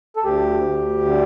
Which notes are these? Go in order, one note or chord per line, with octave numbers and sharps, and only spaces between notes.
A4
D2 G4
D2
D3